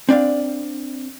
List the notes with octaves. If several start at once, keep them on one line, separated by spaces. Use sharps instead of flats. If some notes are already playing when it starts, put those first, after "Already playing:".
C4 D4 D5 F5